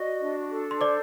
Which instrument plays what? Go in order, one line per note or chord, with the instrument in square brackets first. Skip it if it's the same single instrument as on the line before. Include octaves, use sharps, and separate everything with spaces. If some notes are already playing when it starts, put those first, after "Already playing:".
Already playing: [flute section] F#4 D#5 [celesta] D5
[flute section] D4
A4
[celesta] C6
[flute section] C5 [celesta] D5 D6